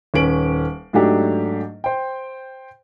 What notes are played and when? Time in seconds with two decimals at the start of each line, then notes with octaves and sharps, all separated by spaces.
0.14 D#1 C#4 B4 D7 F#7
0.93 G#2 F#3 A3 D4 G4
1.84 C5 G5